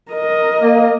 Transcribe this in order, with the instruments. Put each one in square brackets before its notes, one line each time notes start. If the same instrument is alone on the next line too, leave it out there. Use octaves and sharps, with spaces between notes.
[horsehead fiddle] A#4 D#5
[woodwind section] A#3